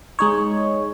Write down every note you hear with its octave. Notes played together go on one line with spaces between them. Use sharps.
G#3 D#4 C#5